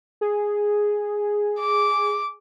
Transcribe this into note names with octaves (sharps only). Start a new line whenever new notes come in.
G#4
D6